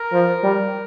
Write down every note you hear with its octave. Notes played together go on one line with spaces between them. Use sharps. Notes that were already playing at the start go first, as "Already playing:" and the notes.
Already playing: A#4
F3
G3